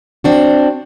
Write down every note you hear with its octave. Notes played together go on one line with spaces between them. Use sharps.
C4 D4 F#4